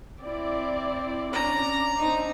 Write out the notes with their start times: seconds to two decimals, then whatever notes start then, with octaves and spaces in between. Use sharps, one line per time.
0.22 C4 E4 D5
1.33 C#4 D4 D5 A#5
1.98 C4 D4 D#4